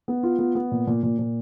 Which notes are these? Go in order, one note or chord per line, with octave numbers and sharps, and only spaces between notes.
B3
F4
B3
B3
A#2
A#2
A#2
A#2